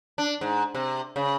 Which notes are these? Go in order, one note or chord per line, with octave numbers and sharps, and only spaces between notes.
D4
G#2
C3
C#3